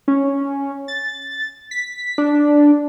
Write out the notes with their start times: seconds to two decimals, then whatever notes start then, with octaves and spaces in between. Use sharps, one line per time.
0.08 C#4
0.88 A6
1.71 B6
2.18 D4